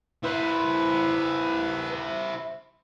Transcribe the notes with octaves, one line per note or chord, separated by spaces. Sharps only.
E4 B4 C5